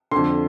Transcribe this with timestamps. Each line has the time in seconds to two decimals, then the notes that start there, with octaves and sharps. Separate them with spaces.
0.11 F2 D3 C6